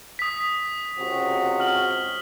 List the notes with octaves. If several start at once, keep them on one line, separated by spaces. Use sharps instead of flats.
D#6 B6
C#2 C3 F#4
F6 F#7